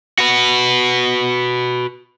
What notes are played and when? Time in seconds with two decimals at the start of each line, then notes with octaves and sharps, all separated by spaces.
0.18 F#4 B4